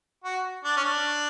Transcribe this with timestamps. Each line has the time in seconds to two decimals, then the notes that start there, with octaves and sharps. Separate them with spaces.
0.24 F#4
0.64 D4
0.77 C#4
0.84 D4